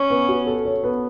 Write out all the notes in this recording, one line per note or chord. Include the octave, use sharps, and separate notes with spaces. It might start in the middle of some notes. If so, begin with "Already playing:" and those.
Already playing: C#4 C#5
B3
F#4
A4
C#5
B3